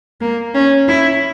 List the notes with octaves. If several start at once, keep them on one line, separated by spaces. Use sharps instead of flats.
A#3
C#4
E4